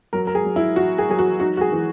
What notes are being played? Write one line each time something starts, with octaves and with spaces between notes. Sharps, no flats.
F#3 A#4
A#4
G#4
F#3
E4
E4 F#4
G#4
F#3 G#4
F#4
D#4 F#4
F#4
G#4
E3